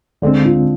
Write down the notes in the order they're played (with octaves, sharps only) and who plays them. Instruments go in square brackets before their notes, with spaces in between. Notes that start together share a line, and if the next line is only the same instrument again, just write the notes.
[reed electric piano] D2 D3 G#3 C4 [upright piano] D4
[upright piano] F4